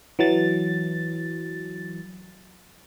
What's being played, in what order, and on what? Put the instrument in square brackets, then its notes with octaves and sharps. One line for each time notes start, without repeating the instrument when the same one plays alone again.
[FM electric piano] E3 F#3 A6